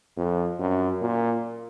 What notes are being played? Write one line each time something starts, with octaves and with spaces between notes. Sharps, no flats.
F2
F#2
A#2